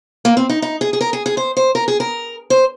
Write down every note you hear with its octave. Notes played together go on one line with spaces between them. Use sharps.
A#3
C4
D#4
D#4
G#4
G#4
A#4
G#4
G#4
C5
C5
A#4
G#4
A#4
C5